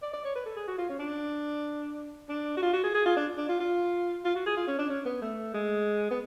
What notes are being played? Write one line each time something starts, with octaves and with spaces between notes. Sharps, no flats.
D5
D5
C#5
B4
A4
G#4
F#4
F4
C#4
D4
D4
F#4
F4
F#4
G#4
G#4
F4
D4
D4
F4
F4
F4
F#4
G#4
F4
C#4
D4
C#4
B3
A3
G#3
B3